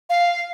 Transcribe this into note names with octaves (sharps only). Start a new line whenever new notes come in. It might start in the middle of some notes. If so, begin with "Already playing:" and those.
F5